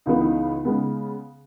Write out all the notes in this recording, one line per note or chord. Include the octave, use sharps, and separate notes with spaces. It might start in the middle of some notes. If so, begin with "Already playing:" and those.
C#2 C#3 E3 B3 D#4
D#4
C#3 G#3 B3